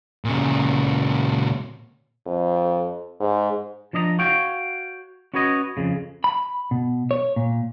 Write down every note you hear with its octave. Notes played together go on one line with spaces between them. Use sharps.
A#2 C#3
F2
G#2
F3 D4 D#5 E5 A#5
F#4 C#5 F5 G5
C#4 F#4 B4 C#5 D#5
F2 C#3
B5
B2
C#5
A#2